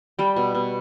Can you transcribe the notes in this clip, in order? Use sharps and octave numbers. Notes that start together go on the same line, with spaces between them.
G3 G5
B2
B2